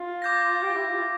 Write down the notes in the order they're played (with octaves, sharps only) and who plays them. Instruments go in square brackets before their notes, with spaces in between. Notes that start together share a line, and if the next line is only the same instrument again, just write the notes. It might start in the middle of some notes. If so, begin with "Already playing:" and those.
Already playing: [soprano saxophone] F4
[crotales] D6 G6 A#6
[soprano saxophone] G4
E4
F4